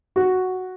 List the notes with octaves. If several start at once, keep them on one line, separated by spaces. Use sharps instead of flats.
F#4